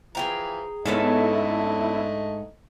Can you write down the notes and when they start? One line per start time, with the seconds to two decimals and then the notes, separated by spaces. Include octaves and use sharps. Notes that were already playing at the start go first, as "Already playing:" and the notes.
0.15 E3 F3 G#4 G5 A#5
0.85 G#2 A3 B3 C#4 D4 E4 A4 D#5